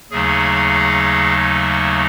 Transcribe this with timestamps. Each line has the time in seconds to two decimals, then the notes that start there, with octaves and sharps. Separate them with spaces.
0.11 D#2 C#3 F#3 A3 D#4 G#4